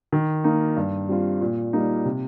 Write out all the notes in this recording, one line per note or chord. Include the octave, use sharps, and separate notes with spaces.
D#3
A#3 D#4
G2
G3 C4 F4
A#2
G3 A#3 D#4
C3